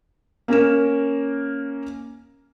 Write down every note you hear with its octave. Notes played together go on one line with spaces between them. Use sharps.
A#3 C#4 A#4 E7